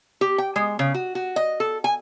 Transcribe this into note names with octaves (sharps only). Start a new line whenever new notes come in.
G4
G5
G#3
C#3
F#4
F#4
D#5
A4
G#5